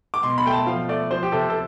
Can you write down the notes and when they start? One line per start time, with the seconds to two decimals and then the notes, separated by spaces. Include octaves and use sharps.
0.14 D6
0.23 B2 C6
0.38 B5
0.46 A3 G5
0.52 A5
0.67 F3 F5
0.88 A3 D5
1.11 F3 C5
1.23 G4
1.32 C3 A4
1.50 A4